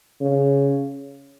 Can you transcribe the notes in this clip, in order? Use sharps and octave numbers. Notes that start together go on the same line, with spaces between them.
C#3